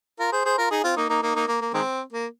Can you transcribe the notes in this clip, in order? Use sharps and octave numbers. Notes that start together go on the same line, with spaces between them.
F4 A#4
G#4 C5
G#4 C5
F4 A#4
D#4 G#4
C4 F4
A#3 D#4
A#3 D#4
A#3 D#4
A#3 D#4
A#3
A#3
D#3 G#3 C4
A#3